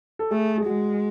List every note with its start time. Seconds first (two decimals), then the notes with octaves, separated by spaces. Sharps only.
0.19 A4
0.31 A3 G#4
0.58 G#4
0.66 G#3 F#4